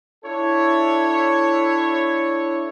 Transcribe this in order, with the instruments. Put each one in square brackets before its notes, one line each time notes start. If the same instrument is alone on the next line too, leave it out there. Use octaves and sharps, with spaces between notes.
[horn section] D4 E4 A4 C#5